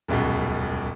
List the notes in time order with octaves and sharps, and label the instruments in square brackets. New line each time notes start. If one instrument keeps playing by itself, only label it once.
[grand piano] D#1 C#2 F#2 B2